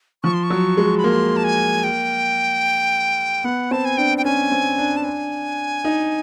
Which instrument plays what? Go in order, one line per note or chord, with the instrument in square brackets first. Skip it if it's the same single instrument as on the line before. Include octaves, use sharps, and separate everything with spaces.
[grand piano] F3 [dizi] C#6
[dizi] C6
C#6
[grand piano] F#3
G#3
[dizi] B5
[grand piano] A#3 [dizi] C6
[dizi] A5
G#5
G5
[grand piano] B3 [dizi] F#5
[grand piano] C4 [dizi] A5
[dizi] G#5
[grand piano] D4 [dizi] G5
[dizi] G5
[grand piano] C#4 [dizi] G#5
[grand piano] C4
D4
[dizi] A5
G#5
[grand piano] D#4